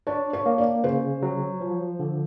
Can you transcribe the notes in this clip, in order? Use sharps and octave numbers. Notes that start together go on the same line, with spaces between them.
D4 C#5
C#5
A#3
D5
C#3 C5
F#3
F3
D3